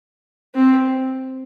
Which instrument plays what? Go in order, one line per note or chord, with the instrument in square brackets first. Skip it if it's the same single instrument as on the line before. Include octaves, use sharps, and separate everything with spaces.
[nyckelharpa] C4